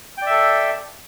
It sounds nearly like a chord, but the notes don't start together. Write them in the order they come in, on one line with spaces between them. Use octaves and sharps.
G5 D5 E5 A4